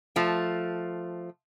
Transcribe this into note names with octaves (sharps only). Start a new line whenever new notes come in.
F3 A3